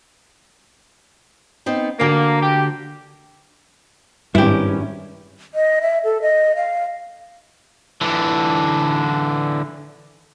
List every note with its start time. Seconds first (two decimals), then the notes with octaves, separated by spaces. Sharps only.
1.66 B3 C4 D#4
2.00 D2 D3 A#3 F#4
2.43 G4
4.35 G#1 G2 C#4 E4 G4
5.55 D#5
5.81 E5
6.04 A4
6.22 D#5
6.56 F5
8.01 D3 E3